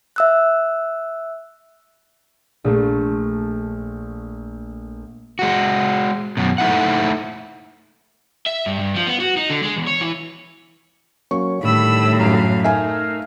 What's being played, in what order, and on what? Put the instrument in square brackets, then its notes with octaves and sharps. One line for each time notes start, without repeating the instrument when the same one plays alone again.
[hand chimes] E5 E6 F#6
[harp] A#1 A3 C7
[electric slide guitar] G#3 F#4
F#2 B2
A3 D#4 E4 F#5
[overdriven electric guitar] E5
G2
G2
F3
B3
F#4
D#4
D3
G#3
E2
C#5
E3
[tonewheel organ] F#3 A#3 C#4 [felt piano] C#6
[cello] A2 [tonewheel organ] D3 D#3 G3 [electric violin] B5 E6
[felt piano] F#2 [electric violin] F#4 F5
[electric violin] A3 D#4 [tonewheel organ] A#4 F5 [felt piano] E5 G#5